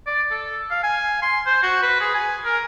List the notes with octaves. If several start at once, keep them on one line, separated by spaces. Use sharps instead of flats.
D5
A4
F5
G#5
C6
C5
F#4
B4
G#4
G#5
A#4